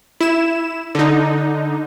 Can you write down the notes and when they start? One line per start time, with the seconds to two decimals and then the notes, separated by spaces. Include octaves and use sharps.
0.21 E4 E7
0.95 D3 D#4